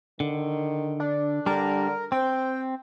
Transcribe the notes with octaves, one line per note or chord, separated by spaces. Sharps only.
D3 D#3
D4
D3 G3 D4 A#4
C4 C5 G5